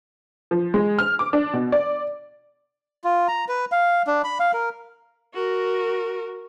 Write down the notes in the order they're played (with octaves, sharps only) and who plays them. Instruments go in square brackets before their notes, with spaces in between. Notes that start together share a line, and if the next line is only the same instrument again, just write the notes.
[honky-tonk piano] F3
G#3
F6
D6
D4
B2
D5
[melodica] F4
A#5
B4
F5
D4
B5
F5
A#4
[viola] F#4 A#4